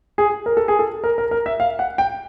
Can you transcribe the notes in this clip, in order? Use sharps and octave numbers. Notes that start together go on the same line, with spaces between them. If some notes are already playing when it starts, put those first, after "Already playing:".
G#4
A#4
A4
G#4
A4
A#4
A#4
A#4
E5
F5
F#5
G5